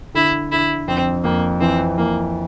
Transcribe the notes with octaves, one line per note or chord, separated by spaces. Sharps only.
D3 E4
D3 E4
F2 C4
F2 A#3
E3 C4
E3 A#3